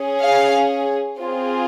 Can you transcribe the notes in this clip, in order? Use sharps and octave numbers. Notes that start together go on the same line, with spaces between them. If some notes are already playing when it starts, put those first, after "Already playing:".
Already playing: C#4 G#4
F5
C4 F4 G#4